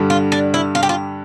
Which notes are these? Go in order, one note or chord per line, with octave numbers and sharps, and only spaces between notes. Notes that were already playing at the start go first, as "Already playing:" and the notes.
Already playing: G2 D3 G3
F4
D4
E4
F4
G4
F4